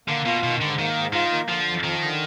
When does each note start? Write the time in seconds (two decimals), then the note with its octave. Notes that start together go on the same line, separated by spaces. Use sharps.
0.08 D3 A#3
0.25 B2 F4
0.43 B2 D#3
0.61 G#2 D3
0.79 D#3 A#3
0.96 G#2
1.13 D#3 F4
1.31 A#3
1.49 D3 F3
1.67 F2
1.84 D#3 F3
2.01 D3